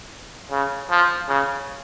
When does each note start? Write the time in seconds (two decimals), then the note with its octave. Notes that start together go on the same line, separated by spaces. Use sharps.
0.51 C#3
0.90 F3
1.28 C#3